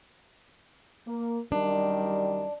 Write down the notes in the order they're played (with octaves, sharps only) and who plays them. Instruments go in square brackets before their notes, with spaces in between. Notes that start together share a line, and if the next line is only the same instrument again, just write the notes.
[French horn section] A#3
[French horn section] F#2 D#3 G3 [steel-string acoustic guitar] D4